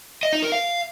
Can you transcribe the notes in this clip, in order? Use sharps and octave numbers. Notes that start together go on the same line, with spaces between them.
D#5
D#4
A#4
F5